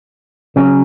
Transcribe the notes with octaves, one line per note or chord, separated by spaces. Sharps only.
C#3 F#3 C#4